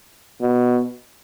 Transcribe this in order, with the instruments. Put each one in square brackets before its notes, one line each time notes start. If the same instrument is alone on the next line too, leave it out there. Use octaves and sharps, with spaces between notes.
[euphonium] B2